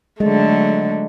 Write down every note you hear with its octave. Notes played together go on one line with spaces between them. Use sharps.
D3 F#3 G#3 A3